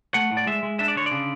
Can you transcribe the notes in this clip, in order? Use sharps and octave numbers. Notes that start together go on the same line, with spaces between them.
A3 F#5
A2
D5
G#3 E5
G#3
D4 E5
D5
D3 C#5
D5
C#3